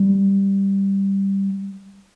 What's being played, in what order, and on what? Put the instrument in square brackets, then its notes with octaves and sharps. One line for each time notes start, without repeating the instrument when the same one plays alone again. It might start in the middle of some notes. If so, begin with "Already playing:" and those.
Already playing: [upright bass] G3